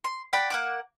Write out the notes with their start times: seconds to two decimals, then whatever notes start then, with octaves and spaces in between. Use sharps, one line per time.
0.04 C6
0.33 D5 F#5 G5 B5
0.50 A#3 F#5 D6